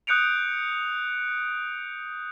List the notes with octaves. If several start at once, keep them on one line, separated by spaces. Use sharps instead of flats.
D#6 F#6 G6 C#7 D7 F7